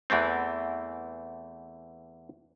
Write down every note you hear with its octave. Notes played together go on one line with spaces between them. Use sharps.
E2 E3 A3 C4